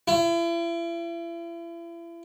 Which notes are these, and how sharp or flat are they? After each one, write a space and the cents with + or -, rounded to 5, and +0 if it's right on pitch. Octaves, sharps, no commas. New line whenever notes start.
E4 +40